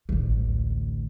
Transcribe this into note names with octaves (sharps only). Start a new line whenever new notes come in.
A1 D2